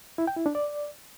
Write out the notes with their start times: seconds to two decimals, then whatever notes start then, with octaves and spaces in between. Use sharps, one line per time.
0.18 E4
0.27 G5
0.37 E4
0.46 D4
0.55 D5